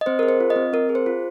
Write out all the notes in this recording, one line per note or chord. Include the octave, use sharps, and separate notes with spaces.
D#5
C4 C5
G#4 A#4
C5
F4
D#5
C4
C4 A#4
G#4
C5
F4